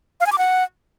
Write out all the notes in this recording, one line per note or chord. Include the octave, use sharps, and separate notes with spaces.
F5
G#5
D6
F#5